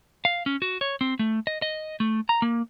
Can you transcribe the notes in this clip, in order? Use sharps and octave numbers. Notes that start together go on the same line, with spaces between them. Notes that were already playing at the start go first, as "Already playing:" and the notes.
F5
C#4
F#4
C#5
C4
A3
D#5
D#5
A3
A#5
A#3